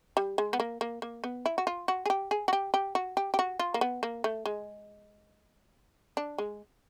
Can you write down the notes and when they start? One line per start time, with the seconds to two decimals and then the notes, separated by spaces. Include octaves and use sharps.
0.17 G3
0.38 G#3
0.53 B3
0.60 A#3
0.81 A#3
1.02 A#3
1.24 B3
1.46 E4
1.58 F#4
1.67 F4
1.88 F#4
2.06 G#4
2.10 G4
2.31 G#4
2.48 F#4
2.53 G4
2.74 G4
2.95 F#4
3.17 G4
3.34 G4
3.39 F#4
3.59 F4
3.74 A#3
3.81 B3
4.03 A#3
4.24 A3
4.46 G#3
6.17 D4
6.38 G#3